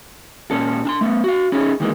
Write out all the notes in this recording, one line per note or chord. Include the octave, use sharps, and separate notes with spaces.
A#2 C#4 A4
D4 A5 C6
A3 B3
F#4 F5
C#4 D#4 E4 G#4 C#5
D2 D#3 E3 G#3 A#3